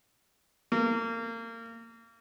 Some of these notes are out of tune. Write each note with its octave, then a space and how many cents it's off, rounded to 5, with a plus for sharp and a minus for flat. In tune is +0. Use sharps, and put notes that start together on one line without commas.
A#3 -30